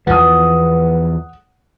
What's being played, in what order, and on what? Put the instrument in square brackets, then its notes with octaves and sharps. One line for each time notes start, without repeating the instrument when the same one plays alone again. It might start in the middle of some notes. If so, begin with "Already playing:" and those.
[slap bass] E2 E3 F3 [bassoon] B3 [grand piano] F#5 D#6